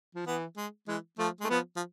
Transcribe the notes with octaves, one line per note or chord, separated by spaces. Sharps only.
F3
E3 B3
G#3
E3 G#3
F3 A3
G#3 A3
F3 B3
F3